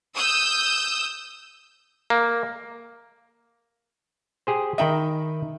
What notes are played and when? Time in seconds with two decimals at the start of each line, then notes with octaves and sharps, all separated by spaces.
0.16 D#6 E6 G6
2.10 A#3
4.47 G4 G#4 C5
4.78 D#3 D#4 D#5 E5 G5 B5